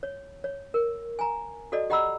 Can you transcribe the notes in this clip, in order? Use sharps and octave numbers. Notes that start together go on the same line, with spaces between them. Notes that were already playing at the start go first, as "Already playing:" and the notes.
C#5
C#5
A#4
G#5 A#5
F#4 A4 D5 D#5
G4 D#5 F#5 A#5 B5 E6